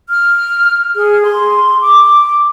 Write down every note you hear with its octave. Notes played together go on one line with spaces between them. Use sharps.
F6
G#4
C6
D6